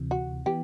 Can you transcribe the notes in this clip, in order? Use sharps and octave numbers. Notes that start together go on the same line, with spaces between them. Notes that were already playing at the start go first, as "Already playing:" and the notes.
Already playing: D2 C3 E3
F#4
E3 B3 G4